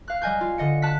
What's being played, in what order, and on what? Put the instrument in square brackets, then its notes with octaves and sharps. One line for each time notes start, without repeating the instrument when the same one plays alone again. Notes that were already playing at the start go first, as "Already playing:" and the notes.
[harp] F5 F#6
G3 D#5 G#5 G6
F4
D3 D#5 C#7
A5 F#6 B6